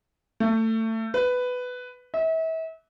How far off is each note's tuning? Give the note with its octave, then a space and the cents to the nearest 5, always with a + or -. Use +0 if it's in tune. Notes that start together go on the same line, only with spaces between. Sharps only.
A3 +25
B4 +10
E5 -35